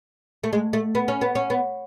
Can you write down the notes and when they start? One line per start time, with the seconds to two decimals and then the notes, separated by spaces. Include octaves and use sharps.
0.44 A3
0.53 G#3
0.73 A3
0.95 B3
1.08 C#4
1.21 B3
1.35 C#4
1.50 B3